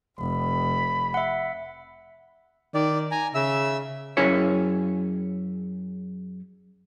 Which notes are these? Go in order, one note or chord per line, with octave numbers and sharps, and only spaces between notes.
F1 B5
E5 F#5
D#3 D5
G#5 A#5
C#3 E5 E6
F#2 C#4 E4 G#4 C#5